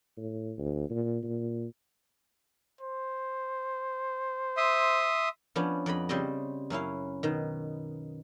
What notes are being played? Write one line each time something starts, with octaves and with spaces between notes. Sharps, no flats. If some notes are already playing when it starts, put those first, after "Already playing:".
A2
D2
A#2
A#2
C5
E5 C6 D#6
F3 B3 C#4 D4
F2 D5 D#5 B5
C#3 G3 C4 G4 C5 D#5
F#2 C#4 E4 F5
B2 D#3